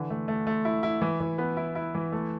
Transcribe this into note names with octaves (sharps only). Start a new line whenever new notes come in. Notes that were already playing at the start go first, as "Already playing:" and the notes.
Already playing: D3 E3
A3
A3
A3
E4
E4
E3
E3
B3
E4
E4
E3
A3